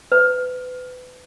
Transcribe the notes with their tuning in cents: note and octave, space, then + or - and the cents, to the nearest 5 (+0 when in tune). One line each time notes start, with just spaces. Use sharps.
B4 +30